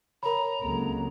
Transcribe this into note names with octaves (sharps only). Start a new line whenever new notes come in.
A#4 C#5 A#5 B5
C#2 F#3 A#3 C4 A4